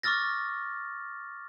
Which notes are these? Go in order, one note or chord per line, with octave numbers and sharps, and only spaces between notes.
C#6 D6 E6 F6 A6 A#6